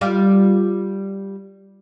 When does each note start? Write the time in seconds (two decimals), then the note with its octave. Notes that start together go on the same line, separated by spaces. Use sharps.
0.01 G3 F4 G4